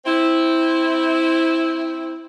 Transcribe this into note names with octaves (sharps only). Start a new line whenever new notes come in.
C4 E4